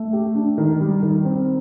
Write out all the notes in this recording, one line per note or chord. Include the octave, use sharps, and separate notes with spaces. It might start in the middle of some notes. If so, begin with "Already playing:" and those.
Already playing: A3
G4
D4
D#3
G3
D#3
C4